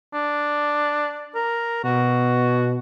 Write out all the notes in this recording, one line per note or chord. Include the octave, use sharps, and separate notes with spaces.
D4
A#4
B2 F#4